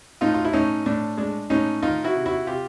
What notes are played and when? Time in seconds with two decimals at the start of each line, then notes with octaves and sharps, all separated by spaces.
0.21 A2 D#4 F4
0.34 F4
0.44 E4
0.53 A2 C#4 D#4
0.86 A2 D4
1.17 G#3 D4
1.50 A2 C#4 D#4
1.82 D#3 D#4 F4
2.04 E4 F#4
2.15 C3
2.26 E4 F#4
2.47 C3 F4 G4